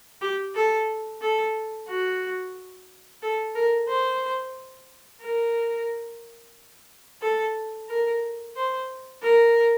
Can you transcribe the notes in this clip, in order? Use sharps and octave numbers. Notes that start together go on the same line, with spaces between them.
G4
A4
A4
F#4
A4
A#4
C5
A#4
A4
A#4
C5
A#4